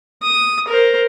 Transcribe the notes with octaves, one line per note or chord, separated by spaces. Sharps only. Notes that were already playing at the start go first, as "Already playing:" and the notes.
D#6
A#4 C5